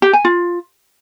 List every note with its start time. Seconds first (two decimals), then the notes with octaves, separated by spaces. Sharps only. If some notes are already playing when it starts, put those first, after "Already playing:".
0.02 G4
0.13 G#5
0.25 F4